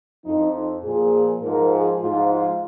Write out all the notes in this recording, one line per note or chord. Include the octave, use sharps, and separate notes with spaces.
F2 F3 D#4
D#4
A#2 F3 G#4
G#2 F3 A#4
G#4
G#2 F3 F4
F4